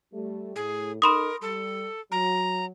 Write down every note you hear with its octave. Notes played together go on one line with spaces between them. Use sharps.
G3 A3
A2 G#4
D#4 A4 A#4 B5 C6 D#6
G3 A4
F#3 A#5